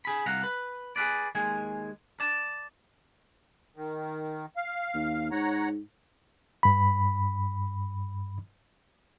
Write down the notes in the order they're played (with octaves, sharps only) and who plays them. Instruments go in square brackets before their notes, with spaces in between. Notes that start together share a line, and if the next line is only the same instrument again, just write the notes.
[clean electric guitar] G#4 B5
C2 F5 F#5 A#5
B4
G#4 A4 B4 D5
D#2 G#3 G#5
D5 A5
[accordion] D#3
F5
[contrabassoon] D#2
[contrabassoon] G#2 [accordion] C#5 F#5 A#5
[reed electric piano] G2 B5